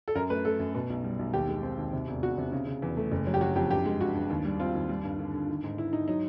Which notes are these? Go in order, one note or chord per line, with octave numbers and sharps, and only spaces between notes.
A4
F#2 A#4
A3 B4
A3 A4
F#2
B2
B1
G3
B1
D#2 G4
G#3
C4
D#2
C3
E1
E1 F#4
C3
C#3
C#3
E2
A3
F#1
F#3
G4
F#3 F#4
F2 G4
G2 G4
G#3
G2 F#4
G2
D#2
G3
C4 F4
D#2
G3
G2
D3
D3
D#3
G#2
G#2 E4
G#2 D#4
F#3 D#4